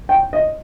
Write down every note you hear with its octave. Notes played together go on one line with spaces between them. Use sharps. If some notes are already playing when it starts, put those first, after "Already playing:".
G5
D#5